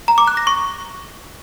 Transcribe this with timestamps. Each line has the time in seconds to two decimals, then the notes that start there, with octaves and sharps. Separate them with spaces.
0.08 A#5
0.18 D6
0.27 F#6
0.37 A#6
0.47 C#6